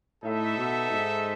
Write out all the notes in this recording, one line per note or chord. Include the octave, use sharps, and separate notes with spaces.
A2 D#4 A4 E5
B2
G#2